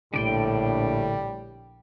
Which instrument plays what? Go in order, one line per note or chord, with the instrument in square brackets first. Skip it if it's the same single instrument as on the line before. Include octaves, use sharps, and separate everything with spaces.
[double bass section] A#1 [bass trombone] A2 [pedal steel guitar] D3 D5 G5 [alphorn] G3